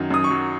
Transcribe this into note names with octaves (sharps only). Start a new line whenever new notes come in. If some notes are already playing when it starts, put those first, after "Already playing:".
Already playing: F#2 D#3 F#3
F#2 D#6
C#6
F#3